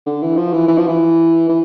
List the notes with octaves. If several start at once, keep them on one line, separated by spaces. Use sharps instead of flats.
D3
E3
F3
E3
E3
F3
E3
E3